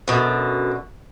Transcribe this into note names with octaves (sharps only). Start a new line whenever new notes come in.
F#2 B2 D3